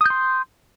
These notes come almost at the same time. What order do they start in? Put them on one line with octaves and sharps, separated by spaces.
D#6 G6 C6